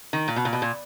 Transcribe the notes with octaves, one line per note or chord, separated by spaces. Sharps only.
D#3
A#2
B2
A#2
B2
A#2